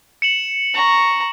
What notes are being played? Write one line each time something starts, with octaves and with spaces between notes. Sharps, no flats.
C#7 E7 F#7
A#5 C#6